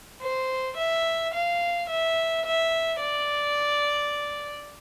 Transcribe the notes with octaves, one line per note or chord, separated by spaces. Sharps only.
C5
E5
F5
E5
E5
D5